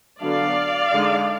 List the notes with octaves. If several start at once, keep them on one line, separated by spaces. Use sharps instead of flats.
D3 F#3 B3 D4 D5 F5
D3 G#3 D#4